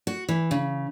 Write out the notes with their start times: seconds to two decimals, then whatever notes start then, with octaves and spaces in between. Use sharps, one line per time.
0.07 F#4
0.28 E3
0.51 C#3